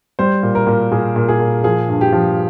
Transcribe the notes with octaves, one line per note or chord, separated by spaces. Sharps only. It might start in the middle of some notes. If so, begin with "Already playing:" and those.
G3 C5
A#2
A#4
A#2
A#2 G#4
A#2
G#4
A#2
F3 G#4
G2
G4
F3